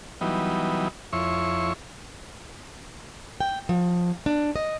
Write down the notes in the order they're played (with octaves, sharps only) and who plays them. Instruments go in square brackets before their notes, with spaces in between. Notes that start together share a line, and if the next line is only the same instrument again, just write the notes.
[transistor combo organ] E3 F#3 G3 B3 D#4
F2 E4 C#5 C6 C#6
[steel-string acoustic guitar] G5
F3
D4
D#5